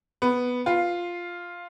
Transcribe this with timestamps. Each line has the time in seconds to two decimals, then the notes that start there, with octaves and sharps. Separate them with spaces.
0.22 B3
0.66 F4